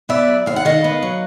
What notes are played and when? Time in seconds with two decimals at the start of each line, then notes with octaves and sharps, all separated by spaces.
0.09 B3 D5 E5
0.28 F#3
0.46 D#2 F5
0.56 F#5
0.65 D#3 D#5 F5
0.84 B3
1.03 F#3